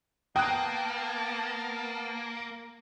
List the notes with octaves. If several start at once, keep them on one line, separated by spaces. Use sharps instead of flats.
A#3 B3 G5 A5 D#6 F#6